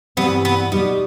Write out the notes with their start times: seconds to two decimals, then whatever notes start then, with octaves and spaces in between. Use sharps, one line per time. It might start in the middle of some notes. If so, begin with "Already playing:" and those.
0.17 G2 E3 G3 B3 C4
0.45 B3
0.72 B2 G3 B3 D#4